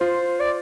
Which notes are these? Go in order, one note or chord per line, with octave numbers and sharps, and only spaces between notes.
F4 C5
D5